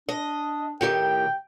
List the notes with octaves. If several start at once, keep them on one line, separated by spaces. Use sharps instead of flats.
D4 D#5
A2 D#3 G4 G5